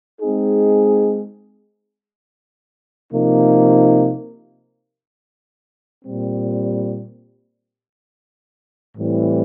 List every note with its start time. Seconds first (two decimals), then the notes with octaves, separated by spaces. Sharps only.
0.21 G#3 C4 D#4 G#4
3.13 C3 F3 A#3 D#4
6.05 A#2 G3 C4
8.97 A2 E3 G3 C4